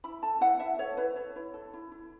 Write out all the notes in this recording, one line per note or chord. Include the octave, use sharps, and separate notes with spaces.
E4 B5
A4 A5
E4 F#5
E4 E5
A4 C#5
E4 B4
A4 C#5
E4
A4
E4
E4